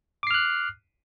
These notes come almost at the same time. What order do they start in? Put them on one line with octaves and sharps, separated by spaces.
D6 C7 F6 F#6